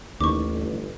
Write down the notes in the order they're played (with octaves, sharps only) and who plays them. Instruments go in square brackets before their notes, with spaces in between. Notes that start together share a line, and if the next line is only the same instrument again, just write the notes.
[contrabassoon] A1 [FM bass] D#2 [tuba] D#3 [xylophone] C#6 D6
[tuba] G1